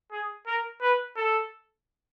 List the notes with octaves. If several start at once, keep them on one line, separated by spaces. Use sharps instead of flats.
G#4
A#4
B4
A4